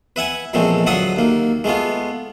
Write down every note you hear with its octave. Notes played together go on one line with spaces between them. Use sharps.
B4 E5 F#5 G#5
A#1 E2 A#2 G#3 A3 C4
D2 F#3 F4 E5 F#5 D#6
D#2 A#3
G#3 A3 B3 F4